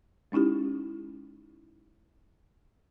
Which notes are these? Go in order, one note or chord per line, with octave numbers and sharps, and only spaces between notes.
G#3 C#4 D#4 E4 G4